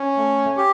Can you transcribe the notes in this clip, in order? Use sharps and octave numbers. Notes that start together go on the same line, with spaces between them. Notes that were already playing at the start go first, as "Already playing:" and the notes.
Already playing: C#4
A3
G4